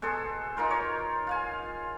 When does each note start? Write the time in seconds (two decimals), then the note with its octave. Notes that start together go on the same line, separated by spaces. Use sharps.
0.02 B2 G#4 A4 C5
0.57 D#4 F4 A#4 C5
0.70 C#5
1.27 F4 F5 G#5